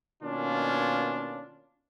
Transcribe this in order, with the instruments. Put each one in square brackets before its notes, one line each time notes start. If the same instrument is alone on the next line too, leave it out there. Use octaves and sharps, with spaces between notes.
[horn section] B2 D#3 A#3 C#4 D4 F4